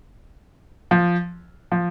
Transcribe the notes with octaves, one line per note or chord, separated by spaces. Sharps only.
F3
F3